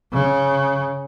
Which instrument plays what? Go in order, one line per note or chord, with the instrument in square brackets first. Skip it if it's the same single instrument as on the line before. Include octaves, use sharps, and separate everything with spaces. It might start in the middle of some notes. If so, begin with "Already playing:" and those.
[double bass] C#3